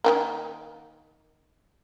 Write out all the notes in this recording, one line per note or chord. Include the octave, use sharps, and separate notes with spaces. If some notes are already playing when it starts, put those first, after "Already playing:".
D#3 E3 A#3